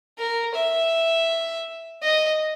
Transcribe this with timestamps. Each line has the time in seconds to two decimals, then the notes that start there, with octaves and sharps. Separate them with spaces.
0.18 A#4
0.54 E5
2.03 D#5